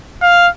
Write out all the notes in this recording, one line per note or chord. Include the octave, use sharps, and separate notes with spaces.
F5